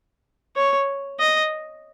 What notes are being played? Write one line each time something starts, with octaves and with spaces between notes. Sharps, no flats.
C#5
D#5